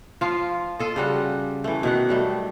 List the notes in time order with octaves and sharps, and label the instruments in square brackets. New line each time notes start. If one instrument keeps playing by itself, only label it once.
[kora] F3 F4
F4 A4 D#5
C#3 G3 F#4
E3 A3
B2 D#3 F#5
F#3 G3 A3